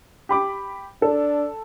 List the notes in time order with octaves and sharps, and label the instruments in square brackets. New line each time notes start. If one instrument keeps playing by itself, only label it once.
[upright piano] G4 B5 D6
[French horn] D4 [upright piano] A4